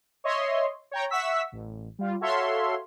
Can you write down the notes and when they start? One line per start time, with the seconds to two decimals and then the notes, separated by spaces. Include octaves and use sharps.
0.24 C#5 D#5 E5 C6
0.91 C#5 G5 A#5
1.10 E5 F#5 C#6 E6 B6
1.52 A1
1.99 G3 F4
2.21 F#4 A4 C#5 E5 F5 C6